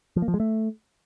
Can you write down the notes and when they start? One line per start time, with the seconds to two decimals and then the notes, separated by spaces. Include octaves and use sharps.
0.16 F3
0.22 A#3
0.28 F3
0.34 G#3
0.40 A3